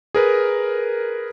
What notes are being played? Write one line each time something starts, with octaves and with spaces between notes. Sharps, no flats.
G#4 A#4 B4